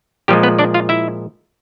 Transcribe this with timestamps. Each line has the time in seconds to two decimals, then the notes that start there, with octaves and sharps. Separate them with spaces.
0.28 A#2 F3 G3 G#3 G4
0.43 B3 B4
0.59 D4 D5
0.74 F4 F5
0.89 E4 E5